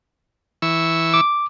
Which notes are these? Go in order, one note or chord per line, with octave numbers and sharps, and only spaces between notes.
E3 C#6 E6
D6